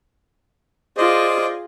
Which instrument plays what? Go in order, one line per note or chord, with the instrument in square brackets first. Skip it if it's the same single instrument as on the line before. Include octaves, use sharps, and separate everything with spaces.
[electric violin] F4 G#4 [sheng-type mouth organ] C5 D5 D#5